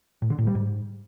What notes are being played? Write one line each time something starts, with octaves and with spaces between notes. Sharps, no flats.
A2
D3
A2
G3
G#2